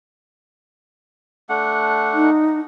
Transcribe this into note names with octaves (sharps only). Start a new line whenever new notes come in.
A3 D4 F#5
D#4